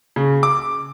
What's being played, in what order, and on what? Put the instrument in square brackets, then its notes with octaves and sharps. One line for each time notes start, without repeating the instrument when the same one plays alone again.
[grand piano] C#3
D6